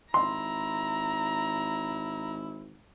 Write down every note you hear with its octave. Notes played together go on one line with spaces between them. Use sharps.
G#1 E4 A#5 C6